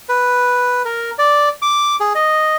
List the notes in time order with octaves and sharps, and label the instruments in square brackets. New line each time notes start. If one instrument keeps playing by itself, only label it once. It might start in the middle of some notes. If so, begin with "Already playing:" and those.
[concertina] B4
A#4
D5
D6
G#4
D#5